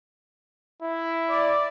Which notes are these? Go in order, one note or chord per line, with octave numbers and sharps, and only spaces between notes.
E4
D5